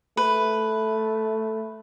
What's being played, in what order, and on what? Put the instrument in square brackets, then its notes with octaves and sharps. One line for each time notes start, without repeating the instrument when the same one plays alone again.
[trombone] A3 [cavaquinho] B4